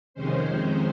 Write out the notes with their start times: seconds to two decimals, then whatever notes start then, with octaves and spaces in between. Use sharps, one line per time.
0.14 F2 C3 D#3 G#3 C#4 C5